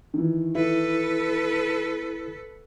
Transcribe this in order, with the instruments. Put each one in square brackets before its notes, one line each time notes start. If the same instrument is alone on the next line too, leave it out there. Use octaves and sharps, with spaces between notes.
[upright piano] D#3 E3
[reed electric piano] E4 [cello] A4 B4